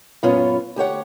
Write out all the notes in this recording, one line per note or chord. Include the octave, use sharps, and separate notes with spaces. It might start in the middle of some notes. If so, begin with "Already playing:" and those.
F#2 A#2 B3 C#4 F4 C#5
D2 G4 C#5 F#5